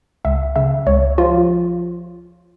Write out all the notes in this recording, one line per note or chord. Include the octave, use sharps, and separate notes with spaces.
C#2 E5
C#3 E5
C#2 C#5
F3 F4